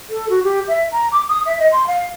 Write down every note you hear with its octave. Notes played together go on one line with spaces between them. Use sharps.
A4
F#4
G4
E5
A#5
D6
D#6
E5
D#5
C6
F5